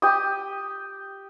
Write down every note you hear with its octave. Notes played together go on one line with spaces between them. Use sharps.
G4 D#6